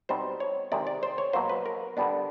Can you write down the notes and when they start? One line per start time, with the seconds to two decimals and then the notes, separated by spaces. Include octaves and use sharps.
0.09 B2 G3 C4 D#4 C5
0.40 C#5
0.72 C3 D#3 G#3 D5
0.87 D5
1.03 C5
1.18 C#5
1.33 B2 F#3 A#3 C5
1.49 B4
1.66 A#4
1.97 D3 G3 B3 D4